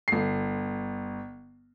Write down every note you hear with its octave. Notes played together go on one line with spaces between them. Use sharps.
G1 C7